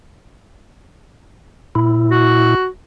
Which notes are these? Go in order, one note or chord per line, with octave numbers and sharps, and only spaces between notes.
A#2 E4
F#4